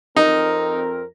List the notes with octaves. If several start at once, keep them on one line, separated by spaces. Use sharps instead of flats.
F2 C4 D#4 A#4